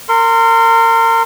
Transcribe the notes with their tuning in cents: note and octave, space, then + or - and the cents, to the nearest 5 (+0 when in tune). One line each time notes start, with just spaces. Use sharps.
A#4 -30 C6 +0